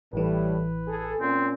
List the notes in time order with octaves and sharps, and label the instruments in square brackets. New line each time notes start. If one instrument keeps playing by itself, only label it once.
[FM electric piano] A1 E3 [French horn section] A2 G3 [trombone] B4
[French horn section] G#4 A4
[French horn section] A#2 C#4 [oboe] C4